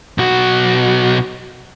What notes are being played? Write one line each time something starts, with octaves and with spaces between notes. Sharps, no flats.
B1 F#4